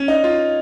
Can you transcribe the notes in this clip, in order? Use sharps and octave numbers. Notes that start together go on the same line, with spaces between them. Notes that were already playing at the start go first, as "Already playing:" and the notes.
Already playing: C#4
D#4
F4